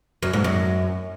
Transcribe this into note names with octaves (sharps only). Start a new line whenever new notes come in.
F#2
G#2
F#2